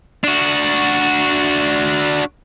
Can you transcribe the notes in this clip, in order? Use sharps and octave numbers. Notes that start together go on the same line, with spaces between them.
D4 F#4